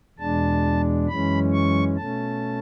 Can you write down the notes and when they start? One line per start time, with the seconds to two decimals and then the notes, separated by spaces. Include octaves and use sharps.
0.19 E2 B2 G#3 D4 A5
1.08 F#2 E3 G#3 C#4 B5
1.53 C#6
1.97 B2 A3 C#4 A5